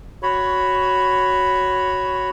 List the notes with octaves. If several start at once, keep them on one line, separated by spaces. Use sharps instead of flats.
F#4 C#5 B5